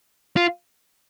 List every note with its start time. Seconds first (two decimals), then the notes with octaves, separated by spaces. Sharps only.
0.36 F4